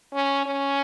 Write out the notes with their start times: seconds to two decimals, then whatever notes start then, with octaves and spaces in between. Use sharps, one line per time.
0.14 C#4
0.46 C#4